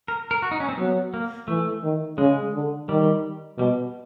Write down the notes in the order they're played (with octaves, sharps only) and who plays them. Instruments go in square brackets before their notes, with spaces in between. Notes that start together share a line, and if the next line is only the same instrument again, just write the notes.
[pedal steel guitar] A#4
A#4
F#4
D#4
C#4
C4
[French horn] F#3 [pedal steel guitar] B3
[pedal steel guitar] A#3
[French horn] E3 [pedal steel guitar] A3
[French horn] D#3
[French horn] C#3 [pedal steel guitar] G#3
[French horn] D3
[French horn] D#3 [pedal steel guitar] G3
[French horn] B2 [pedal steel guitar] G3